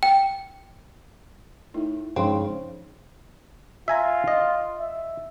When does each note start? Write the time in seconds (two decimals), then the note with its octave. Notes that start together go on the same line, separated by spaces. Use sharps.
0.03 G5
1.74 A2 D#4
2.16 G2 C#3 F3 G#3 C4 D#4
3.88 F4 E5 G#5 A#5
4.28 D#5
4.79 E5